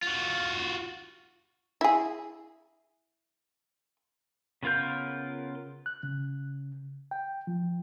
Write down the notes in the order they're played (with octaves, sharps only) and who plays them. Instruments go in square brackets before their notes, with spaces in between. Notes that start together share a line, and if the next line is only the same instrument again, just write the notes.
[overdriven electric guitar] F4 F#4
[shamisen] E4 G#4
[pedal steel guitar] C#3 B3 F4 A#4 G6
[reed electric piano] F#6
C#3
G5
F3